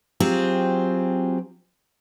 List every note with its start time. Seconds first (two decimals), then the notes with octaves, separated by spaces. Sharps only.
0.20 F#3 C4 F4 G4 G#4